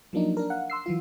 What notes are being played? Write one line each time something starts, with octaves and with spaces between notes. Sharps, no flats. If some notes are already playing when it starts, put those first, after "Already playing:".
F3 F#3 A#3 D4 D#4
D4 A#4
F5 F#5
C6 E6 C7
E3 F#3 F4